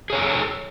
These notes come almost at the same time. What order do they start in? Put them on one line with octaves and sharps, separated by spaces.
G#4 C#5 A#5 A4